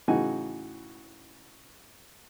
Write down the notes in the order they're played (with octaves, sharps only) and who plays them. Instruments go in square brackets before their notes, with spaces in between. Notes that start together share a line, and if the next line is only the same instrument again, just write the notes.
[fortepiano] A2 C#3 E3 D#4 F#4 G#5